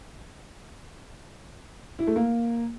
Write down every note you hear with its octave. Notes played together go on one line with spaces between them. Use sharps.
E4
A3
A#3